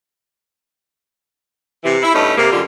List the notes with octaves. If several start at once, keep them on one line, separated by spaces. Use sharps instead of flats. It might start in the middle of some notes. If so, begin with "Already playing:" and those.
C3 E3
E4
G2 A3 C#4 D#4
C3 A#3
F#2 D3 G3 F4